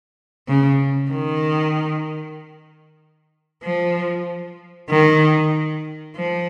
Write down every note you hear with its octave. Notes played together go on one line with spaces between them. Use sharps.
C#3
D#3
F3
D#3
F3